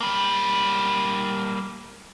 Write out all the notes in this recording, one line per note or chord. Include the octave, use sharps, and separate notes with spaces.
G3 A#3